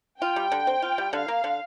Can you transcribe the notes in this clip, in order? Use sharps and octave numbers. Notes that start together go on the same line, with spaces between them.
F4 G5
G3
D3
C4
F4
G3
D3 F5
A#3
D3